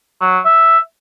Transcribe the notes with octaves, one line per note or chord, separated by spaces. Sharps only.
F#3
E5